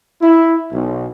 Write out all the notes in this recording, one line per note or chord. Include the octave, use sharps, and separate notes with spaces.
E4
B1